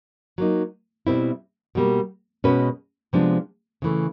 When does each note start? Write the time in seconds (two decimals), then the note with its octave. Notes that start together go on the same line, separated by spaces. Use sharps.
0.38 F#3 A#3 D#4
1.07 B2 G3 C4 E4
1.75 B2 G3 A#3
2.44 B2 G#3 C#4 F#4 B4
3.13 C3 F3 G#3 B3 D4
3.82 C#3 E3 A3